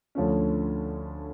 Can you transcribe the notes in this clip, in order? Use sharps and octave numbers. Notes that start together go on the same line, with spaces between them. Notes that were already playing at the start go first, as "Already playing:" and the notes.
D2 D3 F3 A3 C#4